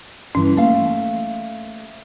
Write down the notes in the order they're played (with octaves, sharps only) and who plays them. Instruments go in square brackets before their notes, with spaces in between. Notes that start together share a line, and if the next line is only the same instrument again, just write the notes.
[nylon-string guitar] G2 E3 [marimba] C#4
[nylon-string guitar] A3 F5 [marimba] A#3